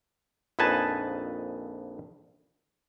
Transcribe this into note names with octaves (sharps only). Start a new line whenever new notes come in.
A#1 F2 D#4 B4 G#5 A5